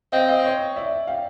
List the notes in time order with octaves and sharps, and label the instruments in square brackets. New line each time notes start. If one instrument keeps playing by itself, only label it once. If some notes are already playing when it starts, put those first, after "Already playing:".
[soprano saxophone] C4 [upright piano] D#5 F5
[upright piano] D#5 F5
C#5 D#5
D5 E5
F5 G5